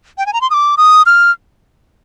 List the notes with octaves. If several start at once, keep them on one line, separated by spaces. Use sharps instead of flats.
G5
G#5
A#5
C6
D#6
D6
D#6
F6